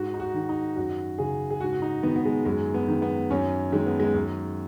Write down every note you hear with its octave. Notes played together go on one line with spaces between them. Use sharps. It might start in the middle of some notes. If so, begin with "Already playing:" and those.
Already playing: G#2 F#4
D#4
F#4
D#3
D#4
F#2 F#4
C#3 G#4
G#4
G#2 F#4
F#4
D#4
D#3 B3
B3
G#3
F#2 G#3
B3
D#3
B3
F#2 C#4
D#3 G#3
B3
G#3
F#2